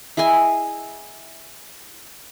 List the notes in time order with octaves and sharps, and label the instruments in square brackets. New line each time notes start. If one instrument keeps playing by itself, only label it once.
[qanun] E4 G#4 D#5 G#5